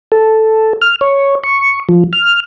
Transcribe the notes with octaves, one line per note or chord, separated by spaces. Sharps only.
A4
F6
C#5
C#6
F3
F6